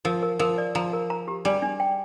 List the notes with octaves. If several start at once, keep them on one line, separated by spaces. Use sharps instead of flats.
F3 A#4
A#4
F3 A#4
D5
F3 A#5
A#4
A#5
G4
G3 D4
D4
G5